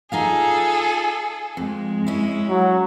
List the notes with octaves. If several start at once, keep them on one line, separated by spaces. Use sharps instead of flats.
D#4 F4 G#4 A4 F5
F2 G#3
C#4 E4
F#3